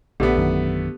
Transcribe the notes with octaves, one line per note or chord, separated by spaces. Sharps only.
A#1 D3 A3 B3 G4
F#2 D#3